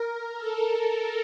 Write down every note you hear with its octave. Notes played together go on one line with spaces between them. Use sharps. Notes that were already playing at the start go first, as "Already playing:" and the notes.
Already playing: A#4
A4